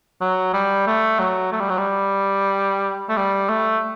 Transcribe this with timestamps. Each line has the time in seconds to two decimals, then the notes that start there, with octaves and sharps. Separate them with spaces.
0.21 F#3
0.53 G3
0.87 A3
1.19 F#3
1.52 A3
1.60 G3
1.70 F#3
1.78 G3
3.09 A3
3.17 G3
3.49 A3